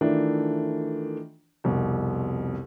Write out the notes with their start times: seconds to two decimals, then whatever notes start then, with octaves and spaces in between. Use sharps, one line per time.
0.01 D#3 E3 A3 D4 F4
1.64 C2 F2 B2